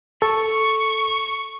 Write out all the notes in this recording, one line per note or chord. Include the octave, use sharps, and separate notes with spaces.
A4 C#6